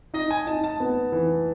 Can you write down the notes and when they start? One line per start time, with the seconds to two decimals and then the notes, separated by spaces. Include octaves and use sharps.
0.14 D#4 D#5
0.31 G#5
0.47 D#4 A5
0.64 A5
0.80 B3
1.12 E3